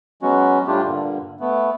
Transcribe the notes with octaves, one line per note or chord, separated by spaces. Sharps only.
F#3 G#3 B3 C#4 F#4
A2 G3 A3 D4 F4 G4
G2 A#2 D3
A3 B3